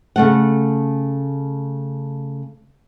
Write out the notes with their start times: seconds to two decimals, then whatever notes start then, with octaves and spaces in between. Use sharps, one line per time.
0.16 C#3 A3 F#5